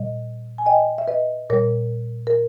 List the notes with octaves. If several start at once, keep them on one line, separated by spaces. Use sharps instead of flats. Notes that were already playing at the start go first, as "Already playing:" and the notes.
Already playing: A#2 G3 D#5
G#5
D#5 G5
E5
B4 D#5
A#2 G3 A#4 C#5
A#4